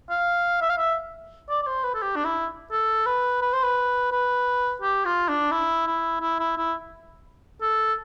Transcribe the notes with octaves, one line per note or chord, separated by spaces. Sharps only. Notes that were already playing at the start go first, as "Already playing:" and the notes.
F5
E5
F5
E5
D5
D5
C5
B4
A4
G4
D4
E4
A4
B4
B4
C5
B4
B4
G4
F4
D4
E4
E4
E4
E4
E4
A4